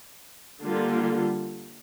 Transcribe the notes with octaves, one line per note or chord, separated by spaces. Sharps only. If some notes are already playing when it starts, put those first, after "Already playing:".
D3 G3 A#3 F4